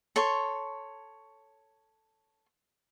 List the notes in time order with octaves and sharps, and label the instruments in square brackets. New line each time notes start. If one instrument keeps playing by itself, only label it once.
[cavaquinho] A4 C#5 C6 C#6